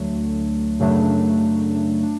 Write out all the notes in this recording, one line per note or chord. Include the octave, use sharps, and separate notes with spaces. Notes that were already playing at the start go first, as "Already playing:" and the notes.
Already playing: D2 D3 F#3 A3 D4
F#2 C#3 F#3 A3 D4
D4